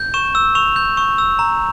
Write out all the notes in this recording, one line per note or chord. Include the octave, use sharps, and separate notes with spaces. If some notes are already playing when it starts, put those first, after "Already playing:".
Already playing: G6
C#6 E7
E6
C#6 F7
G6
C#6
E6
A#5